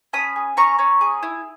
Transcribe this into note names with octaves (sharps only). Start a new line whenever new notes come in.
C#4 B5 D#6
G#4
C#4 A#5 C#6
C#4
G#4
E4